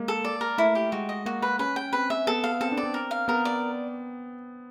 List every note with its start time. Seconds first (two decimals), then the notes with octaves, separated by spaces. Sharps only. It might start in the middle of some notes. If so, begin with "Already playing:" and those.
Already playing: G#3 A#3
0.08 A4
0.25 D5
0.41 A#4
0.58 A3 E4
0.75 G4
0.92 G#3 F#4
1.09 D#5
1.26 A#3 F#4
1.42 B4
1.59 C#4 B4
1.76 G5
1.93 C4 B4
2.10 E5
2.27 B3 A4
2.44 F5
2.61 C4 A4
2.72 D4
2.77 D5
2.83 C4
2.94 A#4
3.11 F5
3.28 B3 A#4
3.45 D5